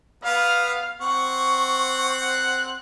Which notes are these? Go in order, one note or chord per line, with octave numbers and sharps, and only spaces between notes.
B3 F5
C4 F#5 C#6
F#6